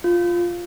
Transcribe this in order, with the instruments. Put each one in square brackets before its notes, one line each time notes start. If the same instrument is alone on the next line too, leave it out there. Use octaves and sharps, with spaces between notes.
[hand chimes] F4